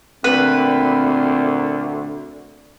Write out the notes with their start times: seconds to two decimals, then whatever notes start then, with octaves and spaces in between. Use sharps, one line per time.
0.24 D2 A#2 C4 B4